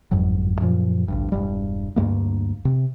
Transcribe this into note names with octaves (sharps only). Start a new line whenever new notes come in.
G1 F2 G#2 F#3
F#2 A#2 F3
A1 D2 G2
E1 G2 G3
D2 G2 G#3 A#3
C3